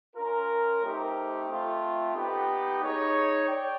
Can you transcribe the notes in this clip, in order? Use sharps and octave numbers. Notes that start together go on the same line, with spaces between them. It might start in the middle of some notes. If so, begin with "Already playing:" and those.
C#4 F4 A#4
A3 C4 D#4 G4 C5
A3 C4 F4
B3 D#4 G4
D#4 G#4 C#5
D5 G5